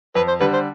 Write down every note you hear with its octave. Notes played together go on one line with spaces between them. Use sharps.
F2 B4
C5
D3 G3 B4
C5